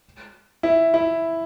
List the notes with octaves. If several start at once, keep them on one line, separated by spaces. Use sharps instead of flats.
E4
E4